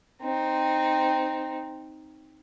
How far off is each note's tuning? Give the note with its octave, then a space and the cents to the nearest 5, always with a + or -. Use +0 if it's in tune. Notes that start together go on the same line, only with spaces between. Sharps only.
C4 +0 D#4 +0